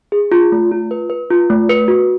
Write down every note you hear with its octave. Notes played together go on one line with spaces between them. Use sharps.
G#4
F4
A3
F4
B4
B4
F4
A3
B4
F#4